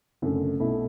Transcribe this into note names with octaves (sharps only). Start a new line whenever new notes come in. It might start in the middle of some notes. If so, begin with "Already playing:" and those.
F#1 F#2 D3 A3 C4
B1 B2 A3 E4